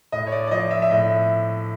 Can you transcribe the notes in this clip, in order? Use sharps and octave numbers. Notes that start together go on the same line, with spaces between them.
A2 D#5
C#5
D5
D5
F3 D#5
E5
E5
A2 D#5